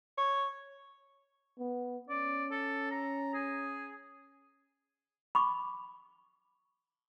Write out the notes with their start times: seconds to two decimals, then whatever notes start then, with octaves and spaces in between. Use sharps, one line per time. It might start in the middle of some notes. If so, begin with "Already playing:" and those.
0.18 C#5
1.59 B3
2.09 C#4 D5
2.51 A4
2.91 A#5
3.34 G#4
5.35 B5 C#6 D6